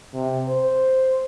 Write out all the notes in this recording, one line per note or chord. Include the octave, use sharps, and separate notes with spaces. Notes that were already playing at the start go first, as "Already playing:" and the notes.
C3
C5